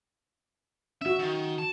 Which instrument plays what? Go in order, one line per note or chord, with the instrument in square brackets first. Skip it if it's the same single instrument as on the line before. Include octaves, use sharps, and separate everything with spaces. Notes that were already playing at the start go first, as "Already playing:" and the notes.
[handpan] C#4 F#4 [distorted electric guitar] E5
[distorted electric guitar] D#3
A5